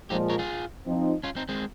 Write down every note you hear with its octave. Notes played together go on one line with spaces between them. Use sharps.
A#2 F3 G#3 D#4 G4
A#4 C#5
F4 G#4
F3 C4 D#4
C#4 F4
C4 D#4
G#3 C4